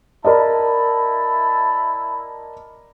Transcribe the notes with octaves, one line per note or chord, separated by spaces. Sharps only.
E4 A#4 D5 D#5 A5 B5